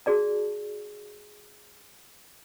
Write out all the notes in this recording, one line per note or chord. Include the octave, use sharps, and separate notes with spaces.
F#4 G#4 D5 A5